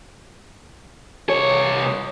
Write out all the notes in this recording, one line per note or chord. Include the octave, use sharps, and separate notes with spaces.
C2 C#5